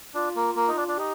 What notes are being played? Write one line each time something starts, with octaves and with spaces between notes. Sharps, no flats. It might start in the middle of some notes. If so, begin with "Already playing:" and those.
D4 F4
A#3
A#3
D#4
D4
D4
D#4 G4